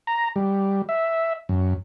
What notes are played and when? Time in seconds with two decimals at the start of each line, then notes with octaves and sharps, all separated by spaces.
0.07 A#5
0.36 G3
0.89 E5
1.49 F#2